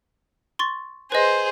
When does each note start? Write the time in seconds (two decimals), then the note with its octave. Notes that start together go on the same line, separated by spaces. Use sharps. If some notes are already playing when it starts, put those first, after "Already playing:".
0.59 C6 C#6 A6
1.12 G#4 B4 C5 D#5